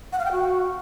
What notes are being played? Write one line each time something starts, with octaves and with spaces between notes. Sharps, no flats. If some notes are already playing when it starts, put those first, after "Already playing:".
F#5
F5
G5
F#4